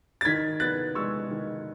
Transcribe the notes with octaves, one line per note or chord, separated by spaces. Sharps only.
A6
D#3 G#6 B6
B3 F#6 A6
G#3 C#6 E6
D#3